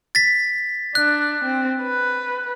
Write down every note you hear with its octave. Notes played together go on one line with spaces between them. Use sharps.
A6 B6
D4 F#6
C4
B4